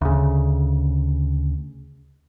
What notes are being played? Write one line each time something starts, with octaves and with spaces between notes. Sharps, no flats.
D2 C#3